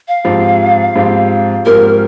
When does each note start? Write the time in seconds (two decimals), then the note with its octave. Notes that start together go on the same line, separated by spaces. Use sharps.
0.08 F5
0.25 G#2 F3 C4 G4
0.96 G#2 F3 C4 G4
1.66 G#2 F3 C4 G4 A#4